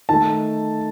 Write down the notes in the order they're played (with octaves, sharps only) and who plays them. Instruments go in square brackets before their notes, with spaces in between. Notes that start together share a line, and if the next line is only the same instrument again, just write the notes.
[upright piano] D#3 A3 A5